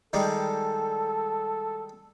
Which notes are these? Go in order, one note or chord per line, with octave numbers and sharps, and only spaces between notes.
D#3 G3 G#3 A4